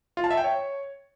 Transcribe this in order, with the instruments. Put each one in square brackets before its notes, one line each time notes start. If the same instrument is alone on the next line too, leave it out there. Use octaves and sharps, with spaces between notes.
[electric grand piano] F4
A5
E5
G5
C#5